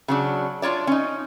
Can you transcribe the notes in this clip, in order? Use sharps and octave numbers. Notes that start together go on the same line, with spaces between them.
C#3 F#3 D4
D4 F4 C#5 D5
C#4 D#4